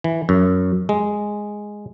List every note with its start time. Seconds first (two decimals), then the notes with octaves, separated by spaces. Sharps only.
0.04 E3
0.29 F#2
0.89 G#3